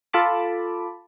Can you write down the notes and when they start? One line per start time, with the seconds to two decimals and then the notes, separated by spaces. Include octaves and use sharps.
0.13 F4 A4 A5 B5 D6